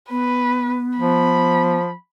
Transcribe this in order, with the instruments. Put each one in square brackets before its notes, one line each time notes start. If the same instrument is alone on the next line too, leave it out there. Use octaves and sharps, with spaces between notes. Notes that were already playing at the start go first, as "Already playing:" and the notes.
[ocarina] B3 [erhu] B4
[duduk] F3 [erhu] B5